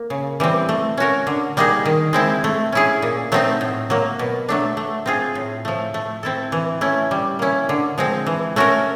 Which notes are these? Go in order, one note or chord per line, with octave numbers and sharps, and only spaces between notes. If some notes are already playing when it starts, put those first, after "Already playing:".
Already playing: A#3
C#3
E3 G3 C4
A3
C#4 F#4 A#4
D3
G3 A#3 D#4 G#4
D#3
G#3 C4 E4
A3
C#4 E4 G#4
A#2
F#3 A3 C4 D#4
A2
F#3 A#3
B2
F#3 A3 D4
A3
C4 F4 G#4
A2
F3 A3
A3
C4 E4 A4
E3
A3 C#4 E4
G3
A#3 C#4 E4
D3
F3 G#3 C4
E3
A3 C#4 F#4 A#4